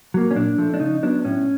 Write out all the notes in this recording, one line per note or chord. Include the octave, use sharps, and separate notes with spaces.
F#3 A#3
C#4
A#2 D4
F3 A3
D4
C#3 D#4
F#3 B3 D4
A2 C#4